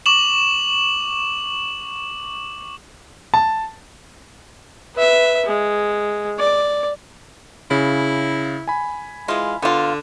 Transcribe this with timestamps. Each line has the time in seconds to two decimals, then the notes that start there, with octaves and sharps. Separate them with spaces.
0.06 C#6 D6 E7 F#7
3.34 A5
4.95 B4 E5
5.45 G#3
6.39 D5
7.71 C#3 E4
8.68 G#5 B5
9.28 E3 G#3 F4
9.62 D3 B3 F4